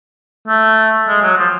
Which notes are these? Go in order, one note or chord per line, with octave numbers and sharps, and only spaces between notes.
A3
G#3
F#3
F3